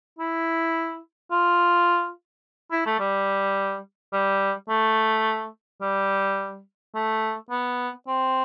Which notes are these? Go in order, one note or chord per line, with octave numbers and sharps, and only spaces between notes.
E4
F4
E4
A3
G3
G3
A3
G3
A3
B3
C4